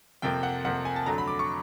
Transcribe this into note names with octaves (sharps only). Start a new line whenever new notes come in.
F2 C3 F3 A#3 G5
F#5
F2 C3 F3 A#3 F#5
G#5
A5
F2 D3 F#3 A3 A#5
B5
D6
C#6